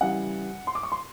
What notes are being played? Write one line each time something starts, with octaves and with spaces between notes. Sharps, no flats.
C#3 E3 G3 F#5
C6
D6
C#6
C6